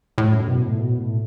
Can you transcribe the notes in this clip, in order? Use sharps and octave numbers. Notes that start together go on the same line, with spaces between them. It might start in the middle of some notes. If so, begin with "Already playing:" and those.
A2
F#2
B2
A2
B2
A2